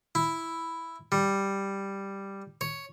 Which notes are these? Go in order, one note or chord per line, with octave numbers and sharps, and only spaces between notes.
E4
G3
C#5